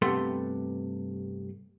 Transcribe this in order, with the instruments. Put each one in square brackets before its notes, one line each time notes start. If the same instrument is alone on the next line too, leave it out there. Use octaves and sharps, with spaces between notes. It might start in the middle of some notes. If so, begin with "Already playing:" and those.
[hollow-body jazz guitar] G2 C3 A3 B3 C6